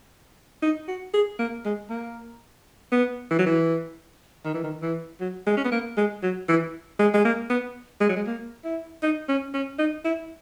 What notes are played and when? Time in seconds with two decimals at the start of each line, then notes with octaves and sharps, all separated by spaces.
0.62 D#4
0.88 F#4
1.14 G#4
1.39 A#3
1.65 G#3
1.90 A#3
2.92 B3
3.31 E3
3.39 F#3
3.46 E3
4.45 D#3
4.54 E3
4.64 D#3
4.82 E3
5.21 F#3
5.47 G#3
5.57 C#4
5.65 B3
5.72 A#3
5.97 G#3
6.23 F#3
6.49 E3
7.00 G#3
7.14 G#3
7.25 A#3
7.50 B3
8.01 G#3
8.09 F#3
8.17 G#3
8.27 A#3
8.65 E4
9.03 D#4
9.29 C#4
9.54 C#4
9.79 D#4
10.05 E4